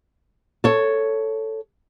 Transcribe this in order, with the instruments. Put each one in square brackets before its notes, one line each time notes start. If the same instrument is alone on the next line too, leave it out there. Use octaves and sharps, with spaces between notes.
[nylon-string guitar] A4 C#5